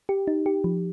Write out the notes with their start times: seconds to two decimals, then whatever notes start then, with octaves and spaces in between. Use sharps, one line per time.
0.09 G4
0.27 D#4
0.46 G4
0.64 F3